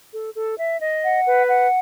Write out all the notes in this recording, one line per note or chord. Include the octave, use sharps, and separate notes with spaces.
A4
A4
E5
D#5
F#5
B4
F#5